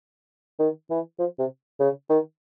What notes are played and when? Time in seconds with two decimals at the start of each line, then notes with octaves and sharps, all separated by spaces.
0.59 D#3
0.90 E3
1.19 F3
1.39 C3
1.80 C#3
2.09 D#3